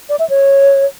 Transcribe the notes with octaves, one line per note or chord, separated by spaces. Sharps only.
D5
E5
C#5